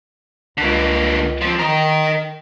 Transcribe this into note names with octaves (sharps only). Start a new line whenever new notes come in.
C#2 D3 A#3
F3 C4
D#3 A#4 D#5